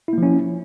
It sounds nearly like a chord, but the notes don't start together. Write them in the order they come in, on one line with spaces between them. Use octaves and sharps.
E4 A#3 F3 C#4